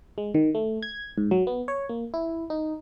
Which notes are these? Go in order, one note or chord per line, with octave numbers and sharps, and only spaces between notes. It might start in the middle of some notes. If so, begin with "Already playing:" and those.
G#3
D#3
A3
G#6
G#2
F#3
B3
C#5
A#3
E4
D#4